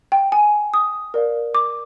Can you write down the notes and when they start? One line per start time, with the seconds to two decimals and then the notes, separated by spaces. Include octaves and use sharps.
0.12 G5
0.32 G#5
0.74 D#6
1.14 A#4 D5 F5
1.55 D6